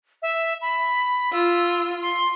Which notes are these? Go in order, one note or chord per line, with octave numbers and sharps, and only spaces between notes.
E5
B5
F4 E6
C6